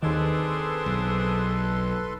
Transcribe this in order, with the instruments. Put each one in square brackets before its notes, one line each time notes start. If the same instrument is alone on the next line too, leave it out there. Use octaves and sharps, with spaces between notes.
[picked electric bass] D#2 D#3 [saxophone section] C4 D4 G#4 [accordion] A4 B4 C6
[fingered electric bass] B1